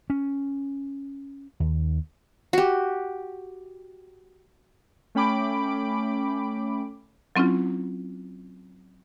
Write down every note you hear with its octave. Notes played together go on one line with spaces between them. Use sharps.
C#4
D#2
F#4 G4
A3 C#4 G5 B5 D6 D7
F#3 C4 C#4 E4 F4